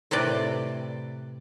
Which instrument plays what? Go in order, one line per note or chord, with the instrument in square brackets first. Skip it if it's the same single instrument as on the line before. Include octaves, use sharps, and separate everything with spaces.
[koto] A2 C3 B4 D5